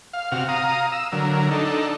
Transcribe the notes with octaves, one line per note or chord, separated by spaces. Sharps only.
F5
C3 F#4 F6
F5 A#5 D#6
E6
D3 F#3 A#4
D4 D#4 A4